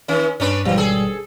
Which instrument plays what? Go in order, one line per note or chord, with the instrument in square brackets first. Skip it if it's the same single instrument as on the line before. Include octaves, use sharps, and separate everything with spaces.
[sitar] D#3 C#4
[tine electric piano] G2 [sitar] C#4 D4 B4
[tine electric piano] G#1 B2 G3 [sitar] E3
[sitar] G#4 A4